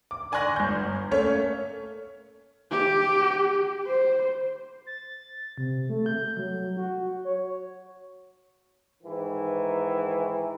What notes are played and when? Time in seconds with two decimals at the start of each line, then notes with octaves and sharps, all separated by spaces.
0.11 D6
0.32 D5 G#5 C6 C#6 F#6 A#6
0.56 G1 G6
1.11 A3 A#3 C#4 A4 C#5
2.71 G4
3.87 C5
4.86 A6
5.58 C3
5.90 A3
6.06 G6
6.37 F#3
6.77 F#4
7.25 C#5
9.02 G#2 D#3 E3